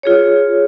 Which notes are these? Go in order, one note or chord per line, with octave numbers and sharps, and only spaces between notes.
F4 G#4 C#5